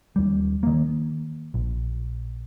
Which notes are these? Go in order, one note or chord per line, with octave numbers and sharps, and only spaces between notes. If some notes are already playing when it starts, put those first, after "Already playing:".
D#2 G3
D#3 A#3
A#1